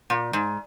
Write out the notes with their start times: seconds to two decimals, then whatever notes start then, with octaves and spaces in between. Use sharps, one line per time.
0.10 A#2
0.33 G#2